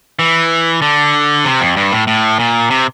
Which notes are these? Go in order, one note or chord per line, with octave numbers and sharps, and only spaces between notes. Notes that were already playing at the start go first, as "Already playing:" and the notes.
E3
D3
C3
F2
G2
A2
A2
A#2
C3